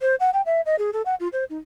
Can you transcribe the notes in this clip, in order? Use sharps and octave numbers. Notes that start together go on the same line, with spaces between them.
C5
F#5
G5
E5
D#5
G#4
A4
F#5
F4
C5
D#4